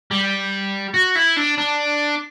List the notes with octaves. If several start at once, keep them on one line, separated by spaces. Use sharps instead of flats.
G3
F#4
E4
D4
D4